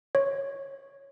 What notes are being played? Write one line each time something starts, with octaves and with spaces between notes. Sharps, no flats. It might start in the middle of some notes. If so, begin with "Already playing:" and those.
C#5